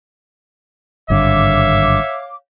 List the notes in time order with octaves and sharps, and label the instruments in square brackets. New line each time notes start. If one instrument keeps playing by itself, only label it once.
[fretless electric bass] G#1 G2 D3 [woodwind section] C#5 F5 D6 [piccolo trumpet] E5